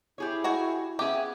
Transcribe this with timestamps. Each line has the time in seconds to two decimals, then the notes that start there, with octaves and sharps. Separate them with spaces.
0.18 E4 G4 G#4 C#5
0.44 F#4 G#5
0.99 B3 C#4 G4 G#4 E5